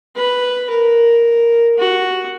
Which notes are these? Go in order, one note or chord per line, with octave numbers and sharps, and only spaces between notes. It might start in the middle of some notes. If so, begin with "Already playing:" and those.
B4
A#4
F#4